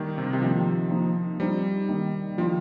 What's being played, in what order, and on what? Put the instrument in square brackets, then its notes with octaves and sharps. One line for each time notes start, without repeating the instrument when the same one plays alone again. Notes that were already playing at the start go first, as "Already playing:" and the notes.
Already playing: [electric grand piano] D#3 G3 A#3
C3
D#3
C3
[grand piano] D#3 G3 A#3 [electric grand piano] F3
[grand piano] F3 A#3 D#4
[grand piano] F3 C4 D#4 [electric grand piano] G3
[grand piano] D#3 A#3 D#4
[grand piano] D#3 A#3 F4 [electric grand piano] F3